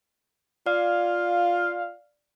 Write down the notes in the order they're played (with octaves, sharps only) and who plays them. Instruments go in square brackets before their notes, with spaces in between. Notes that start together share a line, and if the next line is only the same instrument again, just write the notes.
[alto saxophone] F4 [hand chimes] D5 [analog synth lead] F5